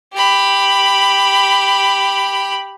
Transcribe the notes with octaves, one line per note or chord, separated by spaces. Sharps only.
G4 B5